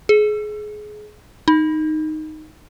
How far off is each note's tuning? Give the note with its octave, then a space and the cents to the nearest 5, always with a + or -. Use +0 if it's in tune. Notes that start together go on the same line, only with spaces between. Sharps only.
G#4 +25
D#4 -5